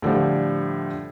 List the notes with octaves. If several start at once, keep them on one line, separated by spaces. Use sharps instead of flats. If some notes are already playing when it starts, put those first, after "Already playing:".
A2 D3 F3 G3